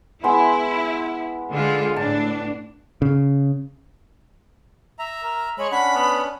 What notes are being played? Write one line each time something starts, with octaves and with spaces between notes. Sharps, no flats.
G#3 B3 E4 C6
D3 G#3 F4
A2 D4 A5
C#3
E5 A#5
A#4
G#3 C#5 B5
C#4 D4 F#5 B5
B3